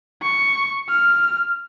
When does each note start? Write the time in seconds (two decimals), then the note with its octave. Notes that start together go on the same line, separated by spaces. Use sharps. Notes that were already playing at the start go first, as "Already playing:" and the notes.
0.22 C#6
0.89 F6